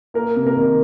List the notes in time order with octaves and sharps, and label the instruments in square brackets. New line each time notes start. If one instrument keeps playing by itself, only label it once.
[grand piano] A#3 [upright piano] A#4
[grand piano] C3
[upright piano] A#4
[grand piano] D#3